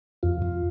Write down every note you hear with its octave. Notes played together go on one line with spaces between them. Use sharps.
F2 F4
F2